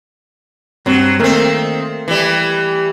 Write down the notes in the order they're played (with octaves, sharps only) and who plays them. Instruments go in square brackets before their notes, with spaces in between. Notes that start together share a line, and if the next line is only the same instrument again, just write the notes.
[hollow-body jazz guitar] G2 C4 [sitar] F#3
[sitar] D#3 C4 [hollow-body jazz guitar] A3 A#3
[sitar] E3 G3